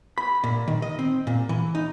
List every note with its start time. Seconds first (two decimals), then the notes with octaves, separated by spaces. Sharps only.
0.18 B5
0.44 A#2
0.68 D#3
0.82 D#5
0.99 C4
1.27 A#2
1.49 E3
1.75 D#4